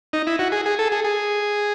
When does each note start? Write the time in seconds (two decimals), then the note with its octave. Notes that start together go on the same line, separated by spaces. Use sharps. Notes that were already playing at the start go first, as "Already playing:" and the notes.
0.13 D#4
0.27 E4
0.39 F#4
0.52 G#4
0.66 G#4
0.79 A4
0.92 G#4
1.04 G#4